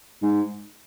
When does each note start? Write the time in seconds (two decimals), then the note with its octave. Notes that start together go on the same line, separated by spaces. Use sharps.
0.22 G#2